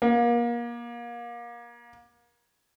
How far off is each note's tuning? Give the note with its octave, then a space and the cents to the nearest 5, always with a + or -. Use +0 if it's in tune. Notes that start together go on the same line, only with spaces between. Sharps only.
A#3 +30